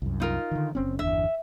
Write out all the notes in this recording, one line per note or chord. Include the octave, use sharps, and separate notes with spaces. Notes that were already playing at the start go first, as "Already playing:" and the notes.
C2 F#2
D#4 F4 A#4
D3 D#3
F#1 C4 C#4
G1 E2 D4 E5